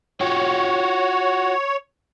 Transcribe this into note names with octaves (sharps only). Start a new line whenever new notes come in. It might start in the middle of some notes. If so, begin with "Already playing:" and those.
F4 F#4 C#5 G5